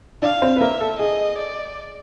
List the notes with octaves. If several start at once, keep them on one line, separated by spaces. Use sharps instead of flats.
D4 D5 F5
C4 C5
B4
A#3 A#4 E5
A4
G#4 D#5
D5